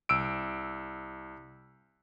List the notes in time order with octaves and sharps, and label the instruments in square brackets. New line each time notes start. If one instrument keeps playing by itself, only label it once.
[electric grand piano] C2 E6 D7